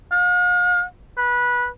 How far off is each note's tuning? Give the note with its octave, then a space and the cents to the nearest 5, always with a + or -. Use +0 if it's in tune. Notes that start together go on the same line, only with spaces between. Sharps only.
F5 +45
B4 -20